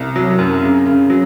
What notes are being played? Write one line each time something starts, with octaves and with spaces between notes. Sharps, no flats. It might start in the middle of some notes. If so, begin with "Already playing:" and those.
Already playing: C2
F#3
F#2
C#3
C#3
F#3